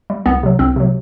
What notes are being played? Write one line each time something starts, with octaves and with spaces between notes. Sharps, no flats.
G3
C2 B3
C3 F#3
C2 C4
C3 F#3